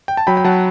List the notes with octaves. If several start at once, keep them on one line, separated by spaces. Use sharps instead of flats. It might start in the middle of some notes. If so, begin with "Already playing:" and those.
G5
A5
F#3 G5 B5
G5
F#3 F#5 A5